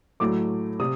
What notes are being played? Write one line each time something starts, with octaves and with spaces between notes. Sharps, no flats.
A2 F#3 A3 D6
C3 D#6